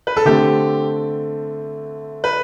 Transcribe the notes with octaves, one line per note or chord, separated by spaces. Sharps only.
B4
A4
D3 A3 C4 G4
B4